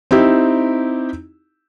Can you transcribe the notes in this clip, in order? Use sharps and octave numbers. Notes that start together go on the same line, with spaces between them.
C4 D#4 E4 G4